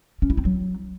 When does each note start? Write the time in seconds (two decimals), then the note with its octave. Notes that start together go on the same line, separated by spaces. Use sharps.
0.22 C#4
0.30 E4
0.37 C4
0.45 F#3